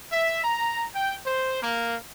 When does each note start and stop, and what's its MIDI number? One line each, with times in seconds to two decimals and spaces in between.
0.12 0.43 76
0.44 0.85 82
0.95 1.16 79
1.26 1.60 72
1.62 1.97 58